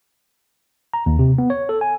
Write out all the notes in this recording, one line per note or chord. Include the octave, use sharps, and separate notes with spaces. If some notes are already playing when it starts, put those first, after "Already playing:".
A#5
D#2
C3
B3
C#5
A4
G#5